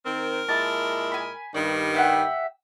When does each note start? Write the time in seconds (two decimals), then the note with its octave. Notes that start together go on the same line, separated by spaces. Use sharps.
0.05 D#3 C4 A#4
0.49 A#2 G#3 E4 A5
1.12 G#5 B5
1.54 G2 D#3 D5
1.94 G4 E5 F#5